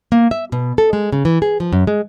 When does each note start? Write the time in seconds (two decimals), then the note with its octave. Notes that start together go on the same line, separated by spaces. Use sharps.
0.12 A#3
0.31 E5
0.52 B2
0.78 A4
0.93 G#3
1.12 C#3
1.25 E3
1.42 G#4
1.60 F3
1.73 F#2
1.87 G#3